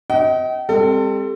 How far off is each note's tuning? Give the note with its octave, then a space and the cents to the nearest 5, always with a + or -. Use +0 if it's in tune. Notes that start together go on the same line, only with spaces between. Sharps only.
D#5 +30 G5 -40
G3 +45 C4 +0 A4 +30